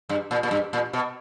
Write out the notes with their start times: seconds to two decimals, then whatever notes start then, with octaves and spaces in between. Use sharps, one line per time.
0.09 G2
0.31 A#2
0.43 A#2
0.51 G2
0.73 A#2
0.93 B2